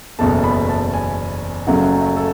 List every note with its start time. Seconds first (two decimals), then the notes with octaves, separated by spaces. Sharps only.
0.19 F#1 E2 B2 A3 A5
0.44 B5
0.69 A5
0.94 G#5
1.67 F#1 F#2 C#3 F#3 A3 F#5
2.17 A4